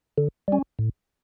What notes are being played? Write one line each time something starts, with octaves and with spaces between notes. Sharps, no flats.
D3
G3 C#4
A2